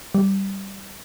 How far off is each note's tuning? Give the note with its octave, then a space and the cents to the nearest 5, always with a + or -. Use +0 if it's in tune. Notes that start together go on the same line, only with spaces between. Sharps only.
G3 -10